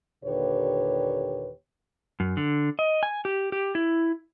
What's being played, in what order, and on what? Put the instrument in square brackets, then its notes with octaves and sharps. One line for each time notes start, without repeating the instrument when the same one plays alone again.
[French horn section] D#2 A#2 D3 G4 B4 C#5
[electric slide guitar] F#2
D3
D#5
G#5
G4
G4
E4